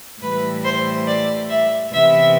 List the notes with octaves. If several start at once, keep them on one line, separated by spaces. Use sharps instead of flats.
A2 E3 G3 B4
C5
D5
E5
C3 E3 B3 E5